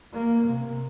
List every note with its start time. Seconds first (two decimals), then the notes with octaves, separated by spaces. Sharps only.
0.13 A#3
0.47 C3